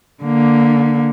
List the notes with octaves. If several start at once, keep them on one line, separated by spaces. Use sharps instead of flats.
D3 A#3